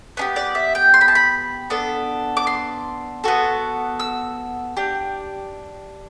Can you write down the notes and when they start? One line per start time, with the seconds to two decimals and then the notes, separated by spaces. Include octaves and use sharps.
0.17 B3 D4 G4
0.36 D5
0.55 E5
0.75 G5
0.94 C6
1.01 B5
1.08 A5
1.15 B5
1.70 B3 D4 A4
2.37 D6
2.47 C6
3.24 B3 F#4 A4
4.00 E6
4.77 D4 G4